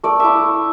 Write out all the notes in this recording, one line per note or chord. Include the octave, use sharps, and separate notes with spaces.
A3 D5
E4 E5